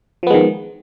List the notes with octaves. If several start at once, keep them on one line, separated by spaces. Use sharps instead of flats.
D#3 F3 G#3 B3